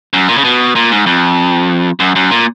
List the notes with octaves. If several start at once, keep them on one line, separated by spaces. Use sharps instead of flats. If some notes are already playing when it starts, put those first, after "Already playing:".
F#2
A#2
C#3
B2
A#2
G#2
F2
F#2
F#2
A#2